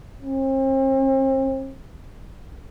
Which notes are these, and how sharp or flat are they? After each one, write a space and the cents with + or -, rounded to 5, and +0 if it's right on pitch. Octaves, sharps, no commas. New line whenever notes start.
C4 +40